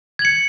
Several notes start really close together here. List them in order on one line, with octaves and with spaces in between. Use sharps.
G#6 F#7 C#7